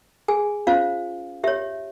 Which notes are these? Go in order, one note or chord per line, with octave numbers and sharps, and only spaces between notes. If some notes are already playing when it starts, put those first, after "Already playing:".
G#4 G#5
C#4 F4 C5 F5
G4 C#5 E5